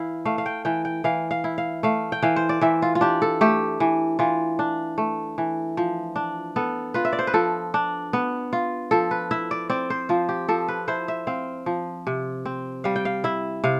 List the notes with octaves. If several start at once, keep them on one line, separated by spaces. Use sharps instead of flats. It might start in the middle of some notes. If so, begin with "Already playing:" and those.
Already playing: E3 E4 F5
A3 F5
F5
G5
E3 G5
G5
E3 F5
F5
E4
F5
A3 F5
G5
E3 F5
C5
D5
E3 E5
F4
F4
D4 G4
A4
A3 G4
E3
E3 F4
D4
A3
E3
F3
D4
B3 A4
F4 B4
E5
D5
C5
B4
F3 A4
D4
B3
F4
F3 A4
B4
E4 E5
D5
C4 D5
C5
F3 F4
G4
F3 A4
B4
E4 C5
E5
C4 F5
F3
C3
C4
G3 F5
G5
F5
E4 E5
C3 F5